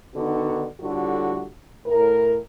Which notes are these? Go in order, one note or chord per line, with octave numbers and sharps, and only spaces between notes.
D3 D#3 B3 D4 D#4 F#4
A2 D3 G3 A3 F4 F#4
A2 A#4